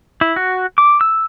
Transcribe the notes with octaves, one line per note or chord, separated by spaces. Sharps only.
E4
F#4
D6
E6